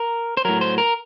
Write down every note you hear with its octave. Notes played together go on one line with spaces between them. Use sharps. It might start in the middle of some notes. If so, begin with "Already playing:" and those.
Already playing: A#4
C5
A2 F#3 A#4
C5
A#4